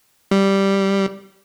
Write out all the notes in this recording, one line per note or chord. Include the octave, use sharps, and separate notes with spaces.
G3